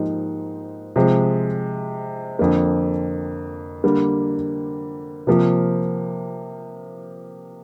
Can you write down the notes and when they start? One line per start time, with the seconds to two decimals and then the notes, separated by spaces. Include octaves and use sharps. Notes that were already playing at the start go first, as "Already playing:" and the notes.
Already playing: G#2 F3 A#3 D#4 G4
0.96 C3 F3 G#3
2.39 F2 D3 F3 A#3
3.84 D3 G3 A#3
5.27 C3 F3 A#3